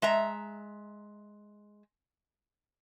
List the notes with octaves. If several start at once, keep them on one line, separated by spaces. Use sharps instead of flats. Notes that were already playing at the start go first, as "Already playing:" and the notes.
G#3 E5 A#5